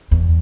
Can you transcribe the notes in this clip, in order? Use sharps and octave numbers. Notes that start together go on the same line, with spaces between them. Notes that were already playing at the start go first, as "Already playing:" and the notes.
E2